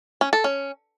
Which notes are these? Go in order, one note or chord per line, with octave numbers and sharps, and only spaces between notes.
C#4
A4
C#4